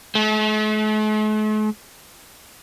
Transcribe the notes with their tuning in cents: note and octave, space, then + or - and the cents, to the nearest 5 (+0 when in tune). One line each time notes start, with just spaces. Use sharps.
A3 -45